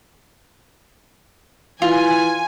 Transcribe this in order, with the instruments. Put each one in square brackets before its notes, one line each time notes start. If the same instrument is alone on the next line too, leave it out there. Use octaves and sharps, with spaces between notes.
[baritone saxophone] E3 [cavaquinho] F4 [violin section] G#5